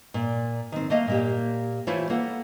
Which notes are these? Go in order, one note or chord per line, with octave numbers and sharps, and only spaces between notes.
A#2 D5
D#3 C4
A3 A#3 D#5 F5
A#2 A#3 G4
E3 A3 E4 F4 C5 C#5
A#3 A4 F#5